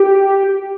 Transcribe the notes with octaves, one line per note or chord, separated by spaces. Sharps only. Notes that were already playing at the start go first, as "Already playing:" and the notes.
Already playing: G4